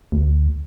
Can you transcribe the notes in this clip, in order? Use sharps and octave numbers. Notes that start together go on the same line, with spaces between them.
D2